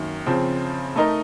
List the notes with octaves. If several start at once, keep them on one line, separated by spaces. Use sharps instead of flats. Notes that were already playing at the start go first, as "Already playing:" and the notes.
Already playing: F#2 D#3 A#3
C#3 F3 C4
A3 D#4 A#4 D#5